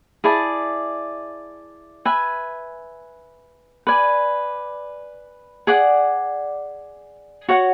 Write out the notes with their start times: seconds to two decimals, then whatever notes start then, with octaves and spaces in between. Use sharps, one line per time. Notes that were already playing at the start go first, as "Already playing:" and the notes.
0.24 E4 G#4 D5 A5
2.05 B4 E5 G#5
3.87 B4 D5 G#5
5.67 G#4 D5 F#5
7.49 F#4 C#5 F#5